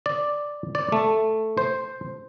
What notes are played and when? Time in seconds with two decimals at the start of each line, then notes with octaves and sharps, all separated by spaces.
0.06 D5
0.75 D5
0.92 A3
1.57 C5